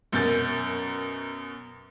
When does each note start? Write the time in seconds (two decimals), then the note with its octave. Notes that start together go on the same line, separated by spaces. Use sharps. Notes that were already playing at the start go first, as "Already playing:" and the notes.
0.12 F#2 B2 A#4 G6 A6